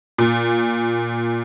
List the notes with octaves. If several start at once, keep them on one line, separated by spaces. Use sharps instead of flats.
A#2